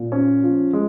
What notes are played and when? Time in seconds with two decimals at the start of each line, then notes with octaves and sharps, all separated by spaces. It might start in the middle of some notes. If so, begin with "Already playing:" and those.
Already playing: A#2
0.12 C#4
0.43 F3
0.73 G#3